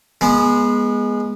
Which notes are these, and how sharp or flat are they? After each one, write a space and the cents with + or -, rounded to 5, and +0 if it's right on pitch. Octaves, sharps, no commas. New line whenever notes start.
G#3 +0 B3 -30